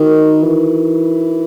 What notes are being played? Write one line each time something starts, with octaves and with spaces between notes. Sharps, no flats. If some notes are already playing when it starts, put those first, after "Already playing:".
Already playing: D#3 D#4 F#4 A#4
E3